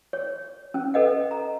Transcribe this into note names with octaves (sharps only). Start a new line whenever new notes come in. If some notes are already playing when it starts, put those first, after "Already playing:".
C#5
C#4
A4 B4 D#5 F#5
A#5